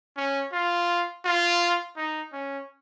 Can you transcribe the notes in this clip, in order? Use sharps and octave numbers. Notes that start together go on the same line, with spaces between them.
C#4
F4
F4
D#4
C#4